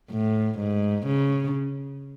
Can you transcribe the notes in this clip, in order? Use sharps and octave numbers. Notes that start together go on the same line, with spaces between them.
A2
G#2
C#3